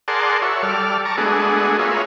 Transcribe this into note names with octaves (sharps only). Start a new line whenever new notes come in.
G#4 A#4 D5 F#5 A5 C6
F#4 C#5 E5
G3 A4 D5 F6
A5 A#5 C#6 D6
G#3 A3 B3 D4 F#4 G#4
F4 G#4 A#4 B4 C#5 E5